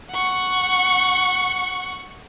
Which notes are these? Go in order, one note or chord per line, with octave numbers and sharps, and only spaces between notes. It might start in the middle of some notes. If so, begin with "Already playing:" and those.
F#5 C#6